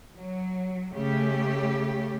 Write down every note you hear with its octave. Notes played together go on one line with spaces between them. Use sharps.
F#3
C#3 A3 G4